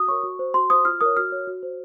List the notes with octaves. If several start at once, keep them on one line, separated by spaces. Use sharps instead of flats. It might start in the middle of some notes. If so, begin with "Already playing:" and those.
Already playing: F#4 D#6
A#4 C#5 C#6
F#4
C5
F#4 C6
C5 D#6
F4 F6
A#4 C#5 D#6
F#4 F6
C#5
F#4
C5